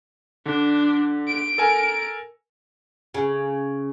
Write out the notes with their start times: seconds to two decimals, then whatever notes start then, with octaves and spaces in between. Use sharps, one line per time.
0.46 D3 D4
1.28 D7
1.58 A4 A#4 G#5
3.14 C#3